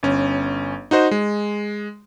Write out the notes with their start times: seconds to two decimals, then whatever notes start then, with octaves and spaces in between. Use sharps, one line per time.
0.03 G1 C#4
0.91 D#4 F#4 C5 D#5
1.11 G#3